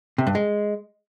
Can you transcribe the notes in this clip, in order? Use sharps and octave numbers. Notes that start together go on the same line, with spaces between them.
C3
G2
G#3